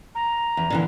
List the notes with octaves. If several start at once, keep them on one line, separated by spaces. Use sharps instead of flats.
A#5
E2
A#2 D3 E3